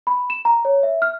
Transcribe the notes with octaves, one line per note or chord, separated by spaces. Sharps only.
B5
E7
A#5
C#5
E5
F6